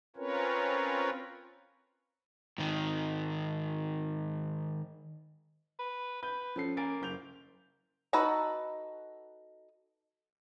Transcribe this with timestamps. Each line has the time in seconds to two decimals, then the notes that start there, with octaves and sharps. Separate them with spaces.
0.16 C4 C#4 F4 A#4 B4 C#5
2.58 G#2 D#3
5.79 B4
6.23 B4 G6
6.56 F3 C#4 A4 C7
6.77 A#3 A#4 G#5 A6 D7
7.01 F#1 G6 F7
8.13 D#4 F#4 A4 B4 A#5